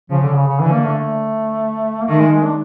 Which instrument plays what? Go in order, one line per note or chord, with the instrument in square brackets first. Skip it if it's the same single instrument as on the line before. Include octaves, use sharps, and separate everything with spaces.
[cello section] C#3 [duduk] F3
[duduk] D3
C#3
C#3
[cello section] D3 [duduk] E3
[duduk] A#3
A3
A3
A#3
[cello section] D#3 [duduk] A3
[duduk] G#3
G#3
D4